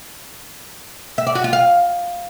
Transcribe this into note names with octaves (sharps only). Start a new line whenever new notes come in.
E5
D5
F#4
F4
F5